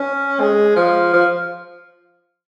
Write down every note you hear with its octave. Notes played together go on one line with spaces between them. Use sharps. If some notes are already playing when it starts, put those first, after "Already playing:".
Already playing: C#4
G#3
F3
F3